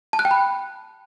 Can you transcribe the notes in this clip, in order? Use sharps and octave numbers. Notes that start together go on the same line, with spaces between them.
A5
F#6
G5
B5